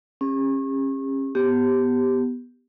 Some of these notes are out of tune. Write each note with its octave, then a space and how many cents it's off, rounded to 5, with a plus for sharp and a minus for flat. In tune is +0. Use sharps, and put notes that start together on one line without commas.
C#4 -30 G4 +45
B3 +0 G4 +0